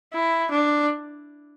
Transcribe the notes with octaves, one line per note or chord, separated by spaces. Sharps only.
E4
D4